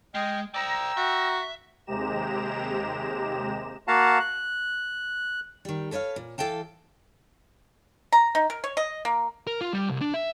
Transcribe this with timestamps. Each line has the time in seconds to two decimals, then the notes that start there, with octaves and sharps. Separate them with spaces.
0.15 G#3 D#5 G5 F6
0.54 C5 D5 G5 A#5 E6
0.97 F#4 E5
1.86 D#2 C3 G#3 G4 A#5 E7
3.88 A#3 F#4 F5 F#5 A5 A#5
4.20 F#6
5.65 D#3 G3
5.91 A4 B4 C#5 E5 F5
6.16 A#2
6.38 E3 A4 F5 G5 A5
8.12 A#5
8.35 D#4
8.50 A#4
8.64 C#5
8.77 D#5
9.05 A#3
9.47 A#4
9.61 F4
9.73 G3
9.89 C2
10.01 D4
10.14 E5